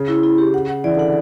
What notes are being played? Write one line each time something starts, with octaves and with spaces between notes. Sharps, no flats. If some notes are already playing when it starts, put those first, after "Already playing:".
Already playing: C#3
E4
E4
G4
F#5
F#5
E3 D5
D3 F#5